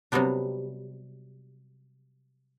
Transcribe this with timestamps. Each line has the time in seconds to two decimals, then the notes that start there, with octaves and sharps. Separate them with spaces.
0.12 C3 F#3 G3 B3 D4